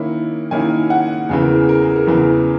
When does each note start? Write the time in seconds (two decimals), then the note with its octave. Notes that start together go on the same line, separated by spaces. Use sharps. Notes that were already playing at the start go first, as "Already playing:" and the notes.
Already playing: D#3 A#3 C#4 E4
0.51 D#3 A#3 C#4 E4 G#5
0.90 F#5
1.29 E2 C#3 E3 G#4
1.42 A#4
1.55 G#4
1.69 A#4
1.83 G#4
1.96 A#4
2.07 E2 C#3 E3 G#4